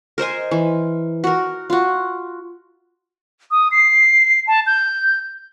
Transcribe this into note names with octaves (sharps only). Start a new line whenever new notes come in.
A#4 C5 D#5 G#5
E3
F#4 A#4
F4 F#4
D#6
C7
A5
G6